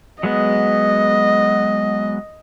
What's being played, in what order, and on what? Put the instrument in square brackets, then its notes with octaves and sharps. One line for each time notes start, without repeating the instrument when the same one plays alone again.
[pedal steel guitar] F#3 G#3 B3 [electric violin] D#5